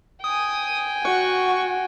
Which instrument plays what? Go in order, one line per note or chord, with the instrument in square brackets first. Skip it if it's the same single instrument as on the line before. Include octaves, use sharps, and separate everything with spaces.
[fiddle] G5 G#5 [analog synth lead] D#6
[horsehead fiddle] F#4 [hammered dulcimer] F#5 [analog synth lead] C#6